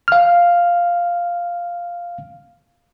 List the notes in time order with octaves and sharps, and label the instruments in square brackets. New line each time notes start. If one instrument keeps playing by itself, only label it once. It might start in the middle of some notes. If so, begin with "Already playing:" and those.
[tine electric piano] F5 F6